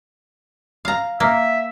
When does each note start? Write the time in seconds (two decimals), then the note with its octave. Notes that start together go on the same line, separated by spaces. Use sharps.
0.85 F5 A#5
1.20 A#3 E5